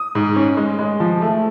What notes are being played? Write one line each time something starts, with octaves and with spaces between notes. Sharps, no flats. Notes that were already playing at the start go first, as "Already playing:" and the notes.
Already playing: D#6
G#2
C#4
G#3
G#3
F3
A3